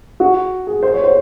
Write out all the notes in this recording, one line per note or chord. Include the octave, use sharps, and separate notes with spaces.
F#4
G#4
C5
C#5
C5